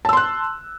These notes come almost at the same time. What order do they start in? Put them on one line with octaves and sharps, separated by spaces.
A5 E6 C6 F#6